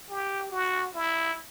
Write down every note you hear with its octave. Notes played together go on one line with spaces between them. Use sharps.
G4
F#4
E4